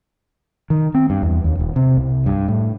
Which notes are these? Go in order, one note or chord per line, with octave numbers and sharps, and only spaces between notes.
D#3
C4
G2
E2
D#2
D#1
C3
C2
G2
A2